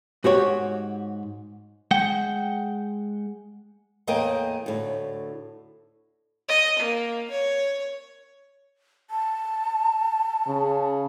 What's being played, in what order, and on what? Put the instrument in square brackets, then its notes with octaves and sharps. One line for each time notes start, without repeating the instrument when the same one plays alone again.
[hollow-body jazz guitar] G#2 F#4 G4 C#5 G5
[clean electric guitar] G#3 F#5 G5
[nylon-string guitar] E2 A2 A#3 A#4 D#5 G5
D2 A2
[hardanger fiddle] D#5
A#3
C#5
[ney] A5
[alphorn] C#3